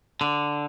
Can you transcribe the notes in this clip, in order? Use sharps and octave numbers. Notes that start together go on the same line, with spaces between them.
D3